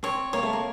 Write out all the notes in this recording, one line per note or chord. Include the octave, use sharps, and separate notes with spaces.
C4 C#5
A#3 C#5
A3
A#3